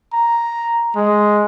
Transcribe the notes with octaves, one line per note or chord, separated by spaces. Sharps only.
A#5
G#3